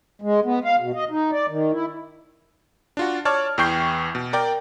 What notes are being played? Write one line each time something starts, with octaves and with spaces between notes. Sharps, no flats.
G#3
B3
F5
B2
D#5
D#4
D5
D#3
E4
D4 F4 F#4
C#5 D5 A5 F6
E2 E3 G5 C#6 G6 C7
B2
A#4 D5 G5